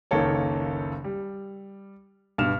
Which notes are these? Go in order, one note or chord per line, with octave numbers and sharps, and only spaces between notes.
F#1 C#2 D#3 A#3 A4 C#5
G3
G2 B2 F6 E7